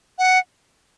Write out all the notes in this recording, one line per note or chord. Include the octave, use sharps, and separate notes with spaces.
F#5